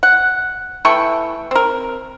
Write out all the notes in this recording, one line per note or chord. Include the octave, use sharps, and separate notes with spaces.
F#5
E3 A3 G5 C#6
C4 A#4